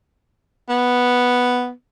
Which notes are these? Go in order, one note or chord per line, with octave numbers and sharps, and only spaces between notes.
B3